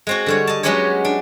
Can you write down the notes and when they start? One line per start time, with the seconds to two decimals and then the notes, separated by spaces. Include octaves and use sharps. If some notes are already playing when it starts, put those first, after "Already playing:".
0.07 G#3 C4 F#4
0.26 D3 G3 C#5
0.47 D#5 A5
0.63 F#3 G#3 B3 C#4 G4 C#5
1.05 D4